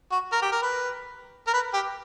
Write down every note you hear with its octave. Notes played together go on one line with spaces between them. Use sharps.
F#4
A#4
G4
A#4
B4
A#4
B4
G4